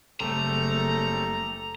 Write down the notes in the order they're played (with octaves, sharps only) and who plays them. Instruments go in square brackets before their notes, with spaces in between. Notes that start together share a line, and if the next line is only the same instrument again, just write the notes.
[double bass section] F#1 [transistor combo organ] C#3 G3 C4 [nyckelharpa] A3 A4 [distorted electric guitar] A#5